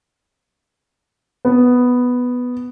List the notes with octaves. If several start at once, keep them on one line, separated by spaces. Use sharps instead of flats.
B3